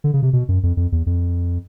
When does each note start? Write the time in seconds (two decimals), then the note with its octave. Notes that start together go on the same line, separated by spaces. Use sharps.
0.04 D3
0.13 C#3
0.23 C3
0.33 B2
0.48 F#2
0.63 F2
0.77 F2
0.92 E2
1.06 F2